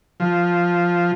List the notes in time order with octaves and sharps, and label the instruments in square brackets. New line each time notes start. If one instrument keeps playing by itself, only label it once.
[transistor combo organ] F3